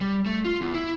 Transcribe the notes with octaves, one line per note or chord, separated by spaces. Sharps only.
G3
A3
F4
E2
E4